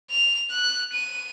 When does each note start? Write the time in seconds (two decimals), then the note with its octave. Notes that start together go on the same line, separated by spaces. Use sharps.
0.10 F7
0.51 F#6
0.93 D#7